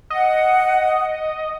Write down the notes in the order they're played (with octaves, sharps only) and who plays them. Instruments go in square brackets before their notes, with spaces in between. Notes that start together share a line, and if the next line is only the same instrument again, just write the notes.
[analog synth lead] D#5 [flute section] F#5